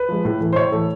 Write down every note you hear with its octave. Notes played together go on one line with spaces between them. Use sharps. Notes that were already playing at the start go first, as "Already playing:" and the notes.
Already playing: B4
F3 G#3
A2
E3 A3
C5
A2 C#5
E3 A3